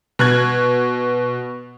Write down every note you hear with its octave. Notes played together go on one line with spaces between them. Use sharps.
B2 F#6 G#6